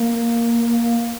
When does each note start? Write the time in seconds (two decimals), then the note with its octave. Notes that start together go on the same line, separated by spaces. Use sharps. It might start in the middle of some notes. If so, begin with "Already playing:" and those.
Already playing: A#3